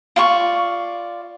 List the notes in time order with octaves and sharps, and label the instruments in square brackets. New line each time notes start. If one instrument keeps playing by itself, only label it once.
[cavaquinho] F4 D5 C#6